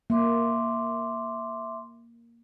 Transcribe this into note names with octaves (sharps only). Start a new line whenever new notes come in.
A#3 E5 C6 D6